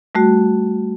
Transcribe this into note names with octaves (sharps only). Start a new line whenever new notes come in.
G3 A3 F#4